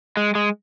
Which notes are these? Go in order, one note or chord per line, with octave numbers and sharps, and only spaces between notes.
G#3
G#3